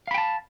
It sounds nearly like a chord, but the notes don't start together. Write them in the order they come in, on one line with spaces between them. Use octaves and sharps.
F5 B5 G5 A5